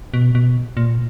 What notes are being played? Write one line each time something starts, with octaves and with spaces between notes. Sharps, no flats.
B2
B2
A#2